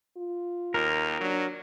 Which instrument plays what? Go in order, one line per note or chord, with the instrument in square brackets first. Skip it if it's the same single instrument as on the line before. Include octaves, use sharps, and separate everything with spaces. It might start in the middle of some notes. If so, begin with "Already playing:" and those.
[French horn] F4
[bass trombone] D#2 [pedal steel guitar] A#4
[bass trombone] F#3 [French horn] D4